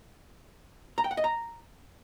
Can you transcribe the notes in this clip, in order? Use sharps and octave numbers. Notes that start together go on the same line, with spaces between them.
A#5
G5
F#5
D#5
A#5